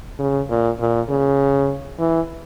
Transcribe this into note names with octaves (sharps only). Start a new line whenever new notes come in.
C#3
A#2
A#2
C#3
E3